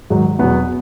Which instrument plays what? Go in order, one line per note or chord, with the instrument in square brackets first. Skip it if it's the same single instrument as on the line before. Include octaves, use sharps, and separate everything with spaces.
[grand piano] G#2 D#3 F#3
E2 B2 F#3 B3